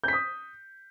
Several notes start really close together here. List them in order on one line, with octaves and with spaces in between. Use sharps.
G6 B6 D#6